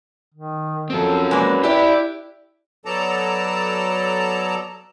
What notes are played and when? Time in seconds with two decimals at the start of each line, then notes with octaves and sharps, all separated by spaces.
0.34 D#3
0.90 F#2 F3 C4 A4
1.31 G#3 A#3 D4 B4
1.64 D4 E4 G4 D5
2.86 F#3 B3 A4 D5 A5 A#5